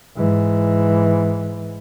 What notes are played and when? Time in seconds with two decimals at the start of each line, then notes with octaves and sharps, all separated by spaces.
0.17 G#2 E3